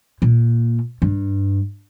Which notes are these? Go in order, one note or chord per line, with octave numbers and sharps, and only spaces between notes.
A#2
G2